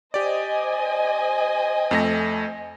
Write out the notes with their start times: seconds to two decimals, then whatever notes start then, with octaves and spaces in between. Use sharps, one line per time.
0.14 G4 C5 D5 D#5 G#5
1.91 F2 A3 A#6